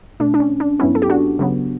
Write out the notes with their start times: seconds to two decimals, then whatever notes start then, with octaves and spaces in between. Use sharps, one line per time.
0.20 B2 A3 D4
0.34 D4
0.40 C#4
0.60 D4
0.80 G2 F#3 B3 C#4 E4
0.95 A4
1.02 G4
1.09 D4 F#4
1.39 C#3 F#3 B3